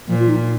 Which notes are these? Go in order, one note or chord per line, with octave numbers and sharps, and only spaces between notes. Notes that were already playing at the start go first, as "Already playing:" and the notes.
A#2 F3
F4
D#4